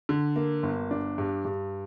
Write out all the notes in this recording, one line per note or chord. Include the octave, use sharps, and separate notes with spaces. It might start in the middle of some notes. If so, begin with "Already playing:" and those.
D3
A#3
G1
D4
G2
G2